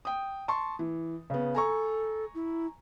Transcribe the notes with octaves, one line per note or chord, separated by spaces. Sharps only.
G5 D#6
A5 C6 C#6
E3
C#3 B3
A4 G#5 A#5 C#6
E4